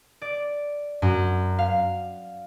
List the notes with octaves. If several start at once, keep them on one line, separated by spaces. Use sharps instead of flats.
D5
F#2
F5